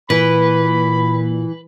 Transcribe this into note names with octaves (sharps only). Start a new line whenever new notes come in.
A#2 E3 B4 B5